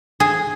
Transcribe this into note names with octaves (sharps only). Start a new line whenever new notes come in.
G#4